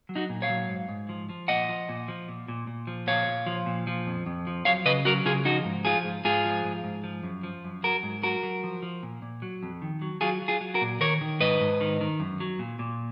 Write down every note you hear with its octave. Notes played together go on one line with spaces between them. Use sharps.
F#3
D#4 F#4
A#2
C#5 F5
F#3
G#2
G#2
F3
F3
A#2 D#5 F#5
F3
A#2
F3
A#2
A#2
A#2
F3
A#2 C#5 F5
A#2
F3
A#2
F3
F2
F2
F3
F#3 C#5 F5
C#3 B4 D#5
F#3 F#4 A#4
C#3 F4 G#4
F3 D#4 F#4
G#2
F3 F4 G#4
G#2
G#2 F4 G#4
F3
G#2
G#2
F3
F#2
F3
F#2
F#3 F#4 A#4
G#2
F#3 F#4 A#4
F#3
F3
F3
A#2
A#2
F#3
F2
D#3
F#3
F#3 F4 G#4
F#3
F4 G#4
F#3
F#4 A#4
A#2
D#3 A#4 C#5
D#3
G#2 B4 D#5
G#2
D#3
D#3
F#2
F#3
A#2
A#2